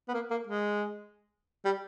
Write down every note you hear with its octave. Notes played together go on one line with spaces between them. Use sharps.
B3
A#3
A#3
G#3
G3